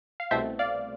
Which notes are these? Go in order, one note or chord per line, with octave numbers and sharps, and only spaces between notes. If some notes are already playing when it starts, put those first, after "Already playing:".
F5
C2 B2 A3 C4 C5 E5
D5 F5